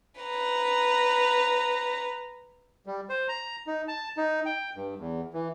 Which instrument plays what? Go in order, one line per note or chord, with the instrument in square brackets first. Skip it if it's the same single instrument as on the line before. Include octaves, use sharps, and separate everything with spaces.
[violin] B4 A#5
[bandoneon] G3
C5
A#5
D#4
A5
D#4
G5
G2
E2
E3